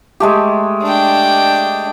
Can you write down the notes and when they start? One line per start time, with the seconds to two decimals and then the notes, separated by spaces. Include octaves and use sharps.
0.20 G#3 A3 G4
0.83 D4 G5